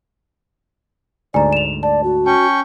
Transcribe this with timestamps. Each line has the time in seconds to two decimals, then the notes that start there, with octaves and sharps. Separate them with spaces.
1.34 D2 G#2 D5 G#5 A#5
1.53 E7 F7
1.83 D5 A5
2.04 F#4
2.26 C#4 G5 A5 C#6